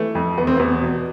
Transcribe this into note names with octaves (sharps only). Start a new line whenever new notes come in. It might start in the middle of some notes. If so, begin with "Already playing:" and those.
Already playing: E3 A3
F2
E2 B3
C4
E2 B3
B2